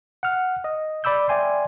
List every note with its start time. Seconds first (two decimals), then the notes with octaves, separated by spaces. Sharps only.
0.23 F#5 F6
0.64 D#5
1.04 D5 B5 D6 E6 G6
1.29 D5 E5 G5 G#5 C6